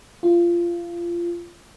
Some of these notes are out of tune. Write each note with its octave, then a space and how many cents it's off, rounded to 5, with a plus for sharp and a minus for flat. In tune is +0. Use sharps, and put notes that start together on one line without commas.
F4 -20